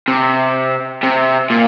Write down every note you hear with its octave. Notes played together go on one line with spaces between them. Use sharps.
C3
C3
A#2